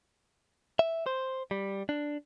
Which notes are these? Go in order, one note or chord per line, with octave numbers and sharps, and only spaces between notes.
E5
C5
G3
D4